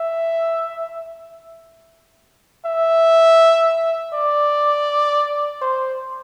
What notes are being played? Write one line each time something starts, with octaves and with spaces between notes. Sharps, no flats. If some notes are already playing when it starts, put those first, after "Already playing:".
Already playing: E5
E5
D5
C5